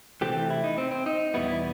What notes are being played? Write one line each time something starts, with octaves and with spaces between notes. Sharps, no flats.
C3 E3 A3 C4 G4
E4
D#4
C4
C4
D#4
E2 B2 G3 B3 E4
E4